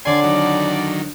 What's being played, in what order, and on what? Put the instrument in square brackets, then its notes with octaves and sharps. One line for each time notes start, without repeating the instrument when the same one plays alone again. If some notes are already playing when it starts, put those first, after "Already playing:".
[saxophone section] F2 D5 [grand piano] D3 C#5 [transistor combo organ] G#5 C6
[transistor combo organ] D#3 F#3